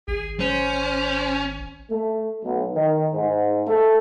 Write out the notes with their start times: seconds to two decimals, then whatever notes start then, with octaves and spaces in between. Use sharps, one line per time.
0.08 G#1 G#4
0.40 C#4 C5
1.90 A3
2.44 B1
2.75 D#3
3.13 G#2
3.67 A3